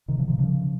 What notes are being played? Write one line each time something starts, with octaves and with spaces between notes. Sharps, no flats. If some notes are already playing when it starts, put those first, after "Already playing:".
C3 D#3
C#3 F3
C3 D#3
C#3 F3